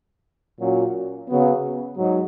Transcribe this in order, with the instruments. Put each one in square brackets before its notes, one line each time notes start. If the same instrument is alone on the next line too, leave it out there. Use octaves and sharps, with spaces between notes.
[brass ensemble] A#2 F#3 C#4 F#4
C#3 F#3 B3
G#2 F#3